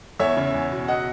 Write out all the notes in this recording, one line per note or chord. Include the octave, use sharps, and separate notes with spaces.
E2 C#5 E5
C#3
E2
B2
D#5 F#5